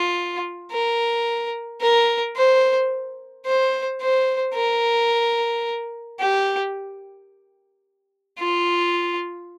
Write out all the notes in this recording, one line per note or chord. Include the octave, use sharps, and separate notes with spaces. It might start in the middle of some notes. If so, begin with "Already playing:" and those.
Already playing: F4
A#4
A#4
C5
C5
C5
A#4
G4
F4